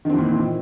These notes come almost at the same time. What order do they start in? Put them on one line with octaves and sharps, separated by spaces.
D#3 C4 E3 A#2